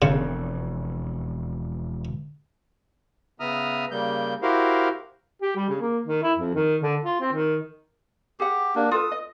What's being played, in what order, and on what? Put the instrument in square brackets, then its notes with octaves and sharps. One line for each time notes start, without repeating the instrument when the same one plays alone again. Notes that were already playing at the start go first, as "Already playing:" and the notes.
[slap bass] E1 F2 [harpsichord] C#3
[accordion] C#3 B3 E5 A#5 D#6 F6
C#3 G3 A#3 G6
E4 F#4 G4 A#4 C5 F5
[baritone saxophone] G4
G3
C#3
A#3
D#3
E4
F2
D#3
D3
F4
C4
D#3
[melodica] G4 [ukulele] G#4 F#5
[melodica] A#3 D4
[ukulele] F4 A4 B4 [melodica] D#6
[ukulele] D#5